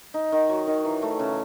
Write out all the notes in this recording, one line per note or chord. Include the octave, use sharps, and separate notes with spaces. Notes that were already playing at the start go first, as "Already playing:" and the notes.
D#4
D#3
F#3
D#3
E3
A3
C#3